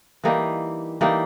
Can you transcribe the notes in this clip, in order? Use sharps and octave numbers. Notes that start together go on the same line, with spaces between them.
E3 G3 A#3 D#4
E3 G3 A#3 D#4